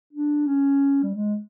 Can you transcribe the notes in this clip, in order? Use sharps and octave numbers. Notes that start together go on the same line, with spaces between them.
D4
C#4
G3
G#3